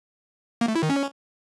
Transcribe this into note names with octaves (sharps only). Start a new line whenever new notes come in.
A#3
A3
E4
D#3
C#4